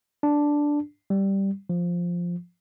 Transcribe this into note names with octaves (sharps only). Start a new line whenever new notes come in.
D4
G3
F3